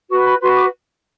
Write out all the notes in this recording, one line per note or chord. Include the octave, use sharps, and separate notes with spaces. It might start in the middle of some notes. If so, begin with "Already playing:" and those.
F#4 B4 C#6
B5
F#4 B4 C6
D6